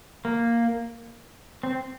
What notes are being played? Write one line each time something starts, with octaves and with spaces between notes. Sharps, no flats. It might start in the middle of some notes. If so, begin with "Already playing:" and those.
A#3
C4